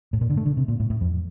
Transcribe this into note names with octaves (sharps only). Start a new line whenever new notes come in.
A2
A#2
D3
A3
D3
C3
A#2
A2
A2
F2